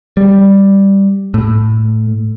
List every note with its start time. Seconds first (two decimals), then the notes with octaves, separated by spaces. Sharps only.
0.17 G3
1.34 A2